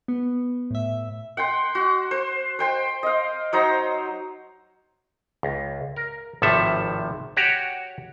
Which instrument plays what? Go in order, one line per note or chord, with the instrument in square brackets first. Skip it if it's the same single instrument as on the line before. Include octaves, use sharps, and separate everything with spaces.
[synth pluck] B3
A2 E5
[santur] F#5 G5 C6
F#4
C5
C5 G5 C6
D#5 F5
F#3 D#4 C5 A#5
[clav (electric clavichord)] C#2
A#4
G#1 A2 C3 F3 A4 E5
F#4 G4 C#5